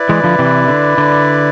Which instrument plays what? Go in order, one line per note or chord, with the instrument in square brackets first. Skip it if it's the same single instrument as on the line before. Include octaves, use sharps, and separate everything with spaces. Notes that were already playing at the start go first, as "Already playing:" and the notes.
Already playing: [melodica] E4 B4 D5
[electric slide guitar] E3 G#3
D3 F3
C3 E3
D3
D3